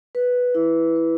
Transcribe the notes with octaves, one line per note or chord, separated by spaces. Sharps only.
B4
E4
B4